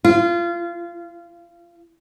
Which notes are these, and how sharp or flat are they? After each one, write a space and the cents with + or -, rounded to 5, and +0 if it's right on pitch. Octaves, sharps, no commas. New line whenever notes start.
F4 -25